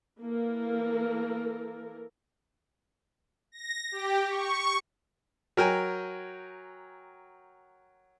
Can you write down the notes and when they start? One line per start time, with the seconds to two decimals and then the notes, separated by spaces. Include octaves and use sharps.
0.22 E3 A#3 A4 A#4
3.52 A#6
3.92 G4
4.29 C#6
5.57 F#3 A#4 G5 G#5